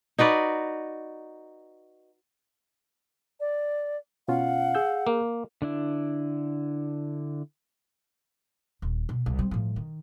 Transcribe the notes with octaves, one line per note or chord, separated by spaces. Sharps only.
D#4 F#4 B4 D5
D5
B2 C#4 F4 F5 F#5
G#4 E6 G6
A#3
D3 D4 E4
D#1
B2
C2
G3 C4
A2 F3
D#3